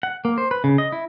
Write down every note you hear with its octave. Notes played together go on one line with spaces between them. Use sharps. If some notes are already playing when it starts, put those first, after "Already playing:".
F#5
A#3
C5
B4
C#3
D#5
E4